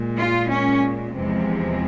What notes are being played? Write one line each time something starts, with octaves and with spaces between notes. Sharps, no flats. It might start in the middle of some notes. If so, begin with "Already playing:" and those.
Already playing: A#2 G#3
F4
C#4
E2 C3 F3 G#3